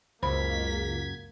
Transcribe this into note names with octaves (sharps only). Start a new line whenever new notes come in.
C#2 F#2 A#3 C5 B5 G#6 B6